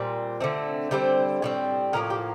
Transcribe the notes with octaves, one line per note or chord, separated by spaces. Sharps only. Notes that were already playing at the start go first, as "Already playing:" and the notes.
Already playing: A#2 G3 C4
D3 A3 C4
D3 G3 C4 C5
A2 G3 C4
A2 F3 A#3 A#4
G4